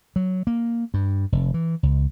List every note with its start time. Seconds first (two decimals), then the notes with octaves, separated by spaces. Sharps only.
0.16 F#3
0.47 A#3
0.94 G2
1.32 F1
1.54 E3
1.83 C#2